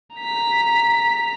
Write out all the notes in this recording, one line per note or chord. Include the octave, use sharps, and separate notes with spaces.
A#5 B6